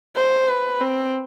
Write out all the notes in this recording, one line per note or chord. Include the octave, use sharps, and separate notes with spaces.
C5
B4
C4